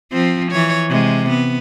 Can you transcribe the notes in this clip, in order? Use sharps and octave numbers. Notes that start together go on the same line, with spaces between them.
F3 C4
E3 C#5
C3 G#3
B3